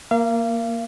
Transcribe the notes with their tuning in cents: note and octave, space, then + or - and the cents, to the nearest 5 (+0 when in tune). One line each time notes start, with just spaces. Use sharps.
A#3 +0 F5 -35